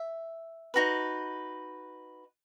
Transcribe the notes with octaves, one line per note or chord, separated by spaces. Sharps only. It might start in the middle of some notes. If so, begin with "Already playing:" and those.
Already playing: E5
D#4 F#4 B4